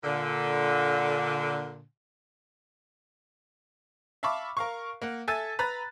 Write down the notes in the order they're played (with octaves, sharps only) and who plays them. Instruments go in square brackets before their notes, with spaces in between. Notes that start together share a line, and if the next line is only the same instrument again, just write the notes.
[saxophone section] A#2 D3
[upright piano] E5 F5 A5 B5 C#6 D6
A#4 F5 C#6
A#3 F#5
A4 E5 G#5 E6 A6 D#7
B4 A#5 B5 F#6 A6